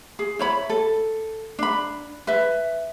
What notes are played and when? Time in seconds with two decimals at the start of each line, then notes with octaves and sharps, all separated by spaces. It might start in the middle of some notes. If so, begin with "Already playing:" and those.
0.19 G#4
0.39 E4 C#5 B5
0.70 A4
1.59 D4 B5
2.27 B4 E5